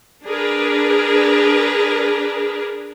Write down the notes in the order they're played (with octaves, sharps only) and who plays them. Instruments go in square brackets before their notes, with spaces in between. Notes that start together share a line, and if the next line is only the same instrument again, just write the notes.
[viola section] D4 G#4 A#4 B4